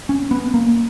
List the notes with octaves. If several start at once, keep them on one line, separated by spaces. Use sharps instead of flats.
C#4
B3
A#3